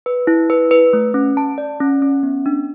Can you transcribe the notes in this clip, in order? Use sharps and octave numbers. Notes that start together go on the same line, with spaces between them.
B4
E4
B4
B4
A3
C#4
A5
D5
C#4
C#4
B3
D4